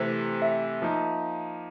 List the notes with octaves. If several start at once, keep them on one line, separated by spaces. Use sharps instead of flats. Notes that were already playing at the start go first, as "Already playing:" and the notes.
Already playing: C3 E3 A3 C5
E5
F3 A#3 D#4